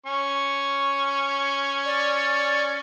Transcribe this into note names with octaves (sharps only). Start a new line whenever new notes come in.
C#4 C#6
D5